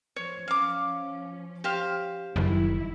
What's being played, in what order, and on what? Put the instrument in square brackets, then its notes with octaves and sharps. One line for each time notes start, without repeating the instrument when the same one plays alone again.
[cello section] F3 C5 [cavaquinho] C#5
[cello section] F3 C#4 [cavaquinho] F5 D6
[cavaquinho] G4 C5 F5
[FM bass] F#1 [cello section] D#3 G3 E4